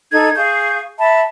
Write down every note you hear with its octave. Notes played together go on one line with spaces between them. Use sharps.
D#4 A4 G#6
G#4 F5 C#6 G6
E5 A5 B5